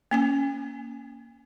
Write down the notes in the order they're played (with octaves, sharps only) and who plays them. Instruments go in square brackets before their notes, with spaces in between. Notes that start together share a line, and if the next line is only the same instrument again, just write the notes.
[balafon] A#3 C#4 G#5